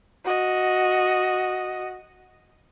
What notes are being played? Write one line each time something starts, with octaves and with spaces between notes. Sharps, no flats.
F#4 D#5